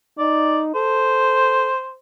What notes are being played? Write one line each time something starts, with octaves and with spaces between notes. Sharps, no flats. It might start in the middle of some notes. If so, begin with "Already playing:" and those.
D#4 D5
A4 C5